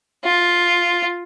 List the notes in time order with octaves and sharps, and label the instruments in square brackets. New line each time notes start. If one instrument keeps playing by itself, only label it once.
[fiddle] F4